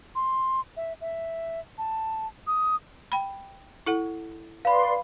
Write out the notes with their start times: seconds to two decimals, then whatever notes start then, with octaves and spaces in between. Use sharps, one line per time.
0.15 C6
0.77 E5
1.01 E5
1.78 A5
2.47 D#6
3.12 G5 B5
3.86 E4 A4 F#5
4.65 B4 D5 F5 B5 C6